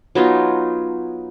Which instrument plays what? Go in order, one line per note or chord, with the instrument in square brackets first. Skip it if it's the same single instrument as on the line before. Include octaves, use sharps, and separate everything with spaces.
[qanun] F#3 B3 D#4 F4